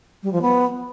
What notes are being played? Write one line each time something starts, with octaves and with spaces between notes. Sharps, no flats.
G3
F3
B3